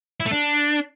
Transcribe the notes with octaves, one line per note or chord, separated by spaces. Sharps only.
E4
A3
D4